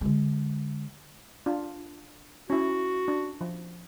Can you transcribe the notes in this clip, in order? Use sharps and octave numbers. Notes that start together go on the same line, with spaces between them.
D3 G#3
D4 F4
C#4 E4 F#4
D4
F3